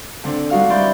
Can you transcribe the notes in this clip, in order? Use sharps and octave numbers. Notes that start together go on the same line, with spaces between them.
D3 C4 D4
G3 D#4 F#4 F5 F6
E3 G3 D5 C6 G6